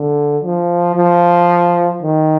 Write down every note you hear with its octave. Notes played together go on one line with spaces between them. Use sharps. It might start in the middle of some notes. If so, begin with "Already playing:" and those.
Already playing: D3
F3
F3
D#3